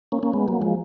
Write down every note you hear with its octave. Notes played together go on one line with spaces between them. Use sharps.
A#3 C#4
A#3 C#4
G#3 B3
F#3 A#3
F3 G#3